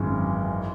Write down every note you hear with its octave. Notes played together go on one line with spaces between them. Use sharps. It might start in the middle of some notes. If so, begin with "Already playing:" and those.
Already playing: G#1 F#2 E3 G#3 C#4